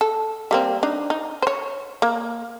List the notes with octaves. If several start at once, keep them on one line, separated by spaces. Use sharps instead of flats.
A4
G3 A#3 C4
D4 D#4
D#4
C5 C#5
A#3